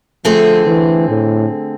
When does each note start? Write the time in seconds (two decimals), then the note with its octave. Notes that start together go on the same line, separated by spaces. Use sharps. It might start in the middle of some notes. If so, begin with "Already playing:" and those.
0.25 D3 F3 A3 C4 G#4
0.67 E3
1.09 A2